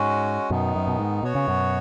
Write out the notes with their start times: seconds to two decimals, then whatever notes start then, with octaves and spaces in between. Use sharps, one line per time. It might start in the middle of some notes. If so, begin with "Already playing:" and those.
Already playing: G#2 G#3 C#4 F#4
0.50 F#2 B2 D#3 B3 D#4
0.75 F#2
0.87 B2
0.99 G#2
1.23 B2 B3 F#4 C#5
1.35 C#3
1.48 F#2 B2